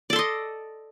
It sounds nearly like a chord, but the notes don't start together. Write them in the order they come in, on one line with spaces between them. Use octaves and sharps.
D5 A4 C6 D#5